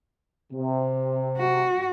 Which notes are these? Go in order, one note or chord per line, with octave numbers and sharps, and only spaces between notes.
C3
F#4